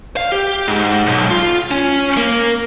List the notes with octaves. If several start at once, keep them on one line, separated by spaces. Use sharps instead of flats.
F5
G4
G#2
B1
F4
C#4
A#3